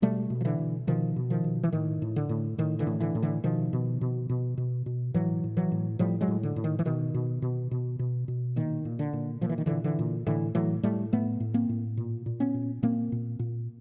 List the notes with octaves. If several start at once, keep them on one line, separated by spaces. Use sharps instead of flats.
B2 G3 A3
B2
F3
D3 E3
B2
B2 D#3 F3
B2
D#3 F3
B2
E3
A2 D#3
A2
D3
A2
A2 D#3
D3 E3
A2
D3 E3
A2
D3 E3
B2 D#3 F3
B2
B2
B2
B2
B2
A2 E3 F#3
A2
E3 F#3
A2
A2 F3 G3
F#3 G#3
A2
D3
A2
D#3
E3
B2 D#3
B2
B2
B2
B2
B2
A#2 D#3
A#2
D3
A#2
A#2 F3
E3
D#3
A#2 D3 E3
D3 E3
A#2
A2 D3 E3
A2 E3 F#3
A2 G3 A3
A2 A3 B3
A2
A#3 C4
A2
A#2
A#2
B3 C#4
A#2
A#2 A#3 C4
A#2
A#2